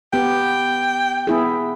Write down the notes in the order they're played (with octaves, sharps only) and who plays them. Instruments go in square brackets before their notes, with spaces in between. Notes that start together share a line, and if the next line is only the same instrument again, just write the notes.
[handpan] B3 G4 [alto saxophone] G5
[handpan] B3 E4 G#4